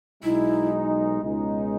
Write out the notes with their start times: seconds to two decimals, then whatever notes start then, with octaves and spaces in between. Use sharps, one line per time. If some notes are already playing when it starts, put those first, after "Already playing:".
0.24 B1 B2 G#3 D#4 E4
1.22 C#2 B2 G#3 D#4